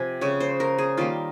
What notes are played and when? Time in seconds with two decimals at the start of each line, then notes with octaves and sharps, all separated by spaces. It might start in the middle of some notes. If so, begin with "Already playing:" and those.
Already playing: C3 F3 G#5
0.21 C#3 G#3 C#5
0.40 C5
0.60 A#4
0.78 G#4
0.98 D#3 G3 A#3 F4